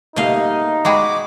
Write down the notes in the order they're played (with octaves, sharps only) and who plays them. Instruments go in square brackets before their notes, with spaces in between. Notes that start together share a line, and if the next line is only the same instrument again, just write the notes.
[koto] B2 D#5 F5 [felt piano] G3 A3 A#3 [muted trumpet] D#4
[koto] G#3 F#4 G#4 [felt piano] D#5 G5 B5 [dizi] D6